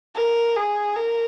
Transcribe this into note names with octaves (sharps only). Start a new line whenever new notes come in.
A#4
G#4
A#4